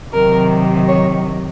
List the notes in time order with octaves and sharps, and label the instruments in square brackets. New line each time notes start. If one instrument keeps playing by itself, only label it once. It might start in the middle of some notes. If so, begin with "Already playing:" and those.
[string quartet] C3 D#3 F#3 A#4
C#5